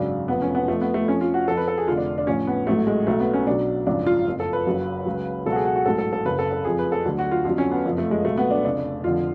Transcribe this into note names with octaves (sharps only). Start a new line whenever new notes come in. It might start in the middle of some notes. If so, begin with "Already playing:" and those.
Already playing: G#1 F#2 C#3 F#3 D4
F1 F2 F3 B3
C#4
B3
F2 F3 A3
B3
A3
F2 F3 C#4
F4
F#4
F2 F3 A4
B4
A4
G#4
F1 F2 D3 F4
D4
D4
A1 A2 F3 C#4
B3
A1 G#2 F#3 A3
G#3
B1 B2 F#3 A3
B3
C#4
B1 B2 F#3 D4
G#1 F#2 C#3 F3 D4
F4
F#1 F2 F3
A4
B4
F#1 F#2 C#3 F#3
C#2 C#3 F#3
C#2 B2 F#3 A4
F#4
G#4
F#4
F#4
A1 G#2 F#3 A4
A4
A4
F#1 F#2 C#3 B4
A4
A4
F2 F3 G#4
B4
A4
D2 D3 F#3
F#4
F4
F2 D3 F#3 F4
C#4
B3
F#1 F2 F3
A3
G#3
C#2 B2 F#3 A3
B3
D4
F1 F2 C#3 D4
F1 F2 D3 F3 F4